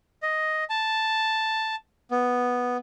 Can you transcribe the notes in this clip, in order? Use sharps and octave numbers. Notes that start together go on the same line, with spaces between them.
D#5
A5
B3